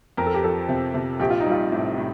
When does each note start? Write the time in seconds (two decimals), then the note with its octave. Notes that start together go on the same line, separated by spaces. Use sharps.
0.17 F2 A#4
0.27 A4
0.35 G4
0.43 F3 A4
0.69 C3
0.94 C3
1.20 A#1 G4
1.30 F4
1.40 D#4
1.46 G3
1.51 F4
1.72 A2
1.98 A2